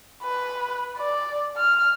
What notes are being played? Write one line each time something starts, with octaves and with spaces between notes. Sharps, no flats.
B4
D5
F6